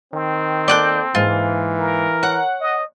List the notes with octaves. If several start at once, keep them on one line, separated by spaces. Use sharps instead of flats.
D#3 C4
A#3 A4 D5 F#6 G6
G#2 E3 A#3 F4
A#4
C#5 F#5
D#5